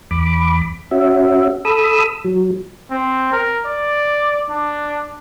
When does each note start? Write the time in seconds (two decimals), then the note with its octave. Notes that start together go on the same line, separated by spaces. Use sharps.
0.11 E2 B5 D6
0.91 C#4 F#4 E5
1.65 A4 B5 D#6 E6
2.25 F#3
2.91 C4
3.32 A#4
3.65 D5
4.50 D4